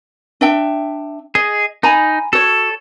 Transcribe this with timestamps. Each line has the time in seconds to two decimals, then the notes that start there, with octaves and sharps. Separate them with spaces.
0.41 D4 E5 G5
1.35 G#4 D#5
1.83 D#4 G#5 A#5 B5
2.33 F#4 A4 C#5